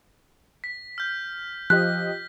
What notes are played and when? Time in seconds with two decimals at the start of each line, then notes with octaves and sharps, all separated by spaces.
0.64 B6
0.98 F6 G6
1.70 F3 G4 D#5 F#6 B6